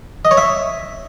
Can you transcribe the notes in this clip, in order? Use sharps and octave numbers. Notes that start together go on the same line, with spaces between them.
D#5
C#5
E5